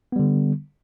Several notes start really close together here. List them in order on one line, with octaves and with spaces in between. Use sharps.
B3 G3 D3